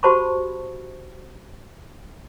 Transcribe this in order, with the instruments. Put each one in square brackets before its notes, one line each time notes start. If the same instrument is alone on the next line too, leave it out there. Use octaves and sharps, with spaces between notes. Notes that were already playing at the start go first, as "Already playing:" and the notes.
[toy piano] F#4 G4 C5 A5 B5 C#6